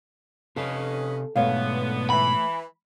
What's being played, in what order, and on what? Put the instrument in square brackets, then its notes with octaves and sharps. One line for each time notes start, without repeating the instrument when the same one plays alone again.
[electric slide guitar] C3 F5 [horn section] C#4 B4 D#5 [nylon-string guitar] A4
[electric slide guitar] G#2 B2 [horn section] D3 B3 [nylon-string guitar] A3 C#5 F5
[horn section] E3 [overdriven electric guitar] B5